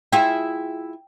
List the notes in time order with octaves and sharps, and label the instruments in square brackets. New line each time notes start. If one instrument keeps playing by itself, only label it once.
[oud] E4 F4 G#4 [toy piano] G5